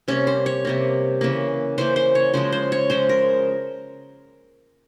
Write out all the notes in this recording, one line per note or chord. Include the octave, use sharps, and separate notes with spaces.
C3 G3 A#3 C#4
C5
C#5
C3 G3 A#3
C#3 E3 A#3
C#3 E3 A#3 C5
C5
C#5
C#3 F3 G#3 C5
C5
C#5
C#3 F3 G#3 C5
A#4